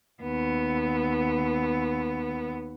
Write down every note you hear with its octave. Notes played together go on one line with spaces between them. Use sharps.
D#2 B3